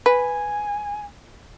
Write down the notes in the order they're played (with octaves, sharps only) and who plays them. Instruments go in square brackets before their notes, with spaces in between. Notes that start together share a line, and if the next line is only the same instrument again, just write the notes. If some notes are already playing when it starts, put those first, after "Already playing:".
[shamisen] B4 [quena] G#5